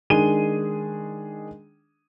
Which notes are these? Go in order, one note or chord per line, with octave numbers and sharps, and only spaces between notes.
D#3 G#3 D4 G#4 D#7 G7